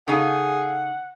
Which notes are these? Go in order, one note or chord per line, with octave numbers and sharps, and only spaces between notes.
C#3 D#4 G#4 A4 F5 F#5